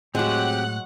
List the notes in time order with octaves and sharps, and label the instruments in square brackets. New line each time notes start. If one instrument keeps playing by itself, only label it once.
[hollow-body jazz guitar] A2 [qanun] F#3 G#3 [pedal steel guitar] C4 G4 [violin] F#5 F#6